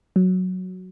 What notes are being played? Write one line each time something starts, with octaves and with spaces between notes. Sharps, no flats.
F#3